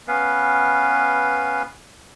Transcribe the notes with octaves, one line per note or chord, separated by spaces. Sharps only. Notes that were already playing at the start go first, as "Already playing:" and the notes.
B3 C#4 B4 F5